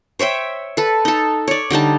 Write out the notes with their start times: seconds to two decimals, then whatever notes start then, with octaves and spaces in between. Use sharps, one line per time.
0.19 C5 C#5 E5 G5
0.77 A4 B4
1.05 D#4 A4
1.48 C#5 D5
1.70 D3 G3 D#4 A5